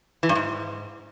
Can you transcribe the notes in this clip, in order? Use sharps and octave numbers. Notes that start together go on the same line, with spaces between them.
E3
G2
G#2